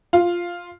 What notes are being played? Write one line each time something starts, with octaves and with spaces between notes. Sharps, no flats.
F4